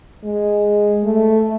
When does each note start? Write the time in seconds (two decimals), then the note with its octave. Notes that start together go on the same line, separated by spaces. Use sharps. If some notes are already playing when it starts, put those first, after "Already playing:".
0.24 G#3
1.04 A3